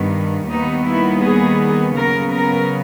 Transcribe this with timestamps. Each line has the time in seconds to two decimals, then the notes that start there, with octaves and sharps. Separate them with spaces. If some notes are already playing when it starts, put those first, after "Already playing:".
Already playing: G2 D#3 G3 B3
0.48 D#2 D#3 G3 B3 D#4
0.86 E4
1.22 G#4
1.96 C#3 F#3 B3 A#4
2.33 A#4